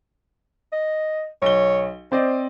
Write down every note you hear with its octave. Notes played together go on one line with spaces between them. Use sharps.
D#5
B1 C#5 G7
C4 C5 D5 D#5